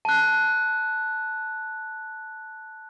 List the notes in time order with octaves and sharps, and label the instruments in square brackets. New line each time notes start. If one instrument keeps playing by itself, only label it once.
[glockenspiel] A5 F#6